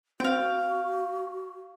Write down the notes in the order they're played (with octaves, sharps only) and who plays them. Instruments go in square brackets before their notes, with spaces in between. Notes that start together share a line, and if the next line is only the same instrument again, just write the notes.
[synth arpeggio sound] C4 [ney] F#4 [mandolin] F5 G5